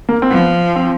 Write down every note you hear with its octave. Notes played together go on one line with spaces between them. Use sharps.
A#3
C4
F3 B3
C4